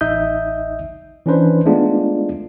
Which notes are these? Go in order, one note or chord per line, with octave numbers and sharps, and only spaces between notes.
A1 D#4 D#5 E5 D#6 G6
E3 C#4 D4 B4 C5
G#3 A3 B3 D4 D#4 F4